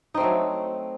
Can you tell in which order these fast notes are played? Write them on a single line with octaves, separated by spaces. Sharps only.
D#4 C4 A3 F#3